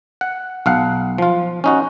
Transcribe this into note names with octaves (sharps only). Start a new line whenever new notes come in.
F#5
B1 F5 F#5
F3 F4
C#4 D#4 F#4